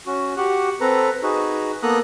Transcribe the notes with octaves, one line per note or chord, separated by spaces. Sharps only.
C#4 F#4
F#4 G4 F#5
C4 A4 B4 A#5
D#4 F#4 G#4 B4
A#3 B3 A4 A#5 D#6 F#6